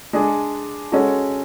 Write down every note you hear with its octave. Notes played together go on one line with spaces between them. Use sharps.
G#3 D4 G#4
G#3 C#4 F#4 A4